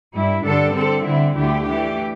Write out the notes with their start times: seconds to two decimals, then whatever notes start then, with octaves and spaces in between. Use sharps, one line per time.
0.14 G2 G3 E4
0.44 G2 D3 G3 D4 A4
0.75 D3 C4 A4
1.05 D3 C4 E4
1.36 D2 D3 A3 E4 G4
1.67 E3 A3 D4 G4